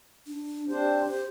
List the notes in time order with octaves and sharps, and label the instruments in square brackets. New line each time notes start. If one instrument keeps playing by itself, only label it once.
[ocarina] D4
[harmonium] C4 D4 C5 [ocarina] G4
[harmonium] C5